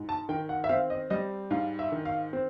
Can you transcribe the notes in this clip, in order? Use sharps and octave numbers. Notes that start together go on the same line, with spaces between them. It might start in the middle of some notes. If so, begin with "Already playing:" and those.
Already playing: G#2
A5
D#3 G5
F#5
E5
C4 F5
D#5
G3 D#5
G#2 F5
E5
D#3
F5
C4